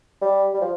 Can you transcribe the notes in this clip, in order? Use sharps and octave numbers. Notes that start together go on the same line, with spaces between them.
G3
G3
F3